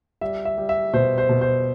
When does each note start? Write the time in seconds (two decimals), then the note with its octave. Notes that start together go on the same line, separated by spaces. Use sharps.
0.21 G3 E5
0.45 E5
0.58 G3
0.69 E5
0.93 B2 C5
1.18 C5
1.29 B2
1.41 C5